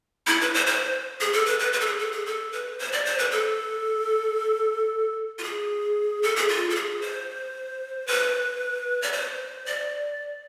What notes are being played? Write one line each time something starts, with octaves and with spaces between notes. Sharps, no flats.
E4
B4
C5
C5
G#4
A4
B4
B4
B4
A4
G#4
A4
G#4
A4
B4
C5
D5
C5
B4
A4
F4
G#4
A4
G#4
F4
A4
G#4
C5
B4
D5
C5
D5